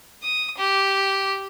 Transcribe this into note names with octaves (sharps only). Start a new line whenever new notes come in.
D#6
G4